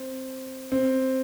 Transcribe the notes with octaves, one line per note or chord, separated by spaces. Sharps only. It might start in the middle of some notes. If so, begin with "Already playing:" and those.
Already playing: C4
C4